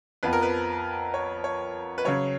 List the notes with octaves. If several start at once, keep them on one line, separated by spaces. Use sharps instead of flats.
F2 F3 B3 B4
A#4
B4
C#5
C#5
B4
C#3 F#3 C#4 C#5